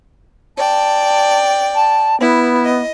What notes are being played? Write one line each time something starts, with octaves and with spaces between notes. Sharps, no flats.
D5 G5 A5
A5
B3 E4
D#5